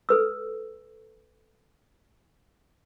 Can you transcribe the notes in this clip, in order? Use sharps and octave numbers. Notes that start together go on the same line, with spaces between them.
A4 B4 E6